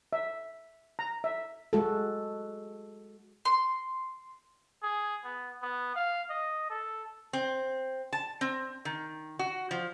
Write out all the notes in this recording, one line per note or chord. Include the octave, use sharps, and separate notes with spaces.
E5
A#5
E5
G#3 F#4 A4
C6
G#4
B3
B3
F5
D#5
A4
C4
A5
C4
D#3
F#4
F3